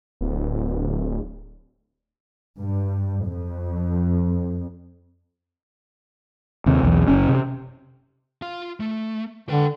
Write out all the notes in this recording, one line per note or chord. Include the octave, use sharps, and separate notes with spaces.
D1
G2
F2
D#2 C3
B1 E2
F#1 C#4
C3
F4 F5
A3
D3 B4 G5